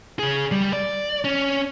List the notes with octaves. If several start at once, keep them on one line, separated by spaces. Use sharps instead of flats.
C#3 G#4
G3
D5
C#4